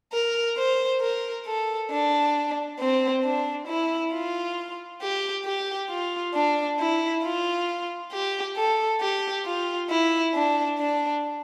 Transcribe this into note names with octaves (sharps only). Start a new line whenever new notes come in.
A#4
C5
A#4
A4
D4
C4
D4
E4
F4
G4
G4
F4
D4
E4
F4
G4
A4
G4
F4
E4
D4
D4